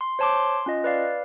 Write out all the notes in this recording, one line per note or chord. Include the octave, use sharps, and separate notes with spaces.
C6
C5 C#5 A5 C6 D6
C6
C#4 F4 D#5
B4 D5 F5